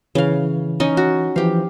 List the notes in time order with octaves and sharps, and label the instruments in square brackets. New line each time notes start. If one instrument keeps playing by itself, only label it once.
[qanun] C#3 F5 [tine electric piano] E3
[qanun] C#4 D#4 D#5
F#4
[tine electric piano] E3 F3 C5 [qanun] G4 F5